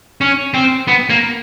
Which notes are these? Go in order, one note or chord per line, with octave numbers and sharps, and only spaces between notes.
C#4
C4
B3
A#3